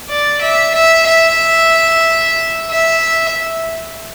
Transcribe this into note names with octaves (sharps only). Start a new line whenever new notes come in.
D5
E5
E5
E5
E5